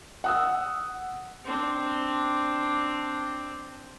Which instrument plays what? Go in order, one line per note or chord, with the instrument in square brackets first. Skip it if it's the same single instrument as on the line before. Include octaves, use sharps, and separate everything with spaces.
[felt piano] F#5 D#6 E6
[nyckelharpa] C4 D4